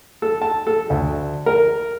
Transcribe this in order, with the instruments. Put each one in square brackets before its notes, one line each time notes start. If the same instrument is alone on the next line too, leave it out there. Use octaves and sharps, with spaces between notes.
[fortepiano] A4
A5
A4
D2
A#4